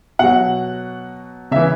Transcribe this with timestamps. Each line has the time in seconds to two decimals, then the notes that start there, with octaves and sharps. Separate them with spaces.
0.19 B2 F#3 F#5
1.51 C#3 E3 E5